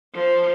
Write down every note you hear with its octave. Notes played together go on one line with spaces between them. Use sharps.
F3